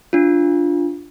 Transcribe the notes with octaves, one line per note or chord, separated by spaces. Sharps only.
D4 F4